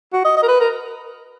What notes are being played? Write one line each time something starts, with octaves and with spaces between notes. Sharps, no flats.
F#4
D#5
D#5
A#4
B4
A#4